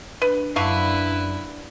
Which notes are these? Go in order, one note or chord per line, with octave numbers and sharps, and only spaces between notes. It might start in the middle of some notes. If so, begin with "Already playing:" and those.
D4 B4
F#2 D3 E4 B4 F5 C#6